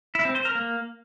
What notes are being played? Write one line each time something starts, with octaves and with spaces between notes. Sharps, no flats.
E4
C4
C5
A#4
A#3